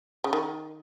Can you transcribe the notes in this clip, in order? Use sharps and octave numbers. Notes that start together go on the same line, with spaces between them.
C#3
D#3